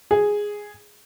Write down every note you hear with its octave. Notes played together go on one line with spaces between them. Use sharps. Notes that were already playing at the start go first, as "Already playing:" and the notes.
G#4